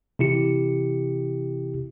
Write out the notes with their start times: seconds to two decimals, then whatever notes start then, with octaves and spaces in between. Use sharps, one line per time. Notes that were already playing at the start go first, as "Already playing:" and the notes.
0.19 C3 E3 E4 G4 C#7